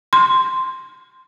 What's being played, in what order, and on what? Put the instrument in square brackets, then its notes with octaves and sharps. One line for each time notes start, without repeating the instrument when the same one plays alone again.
[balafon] C6